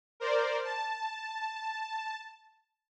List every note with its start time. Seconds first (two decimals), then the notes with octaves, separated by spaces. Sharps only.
0.20 A#4 C5 D5
0.64 A5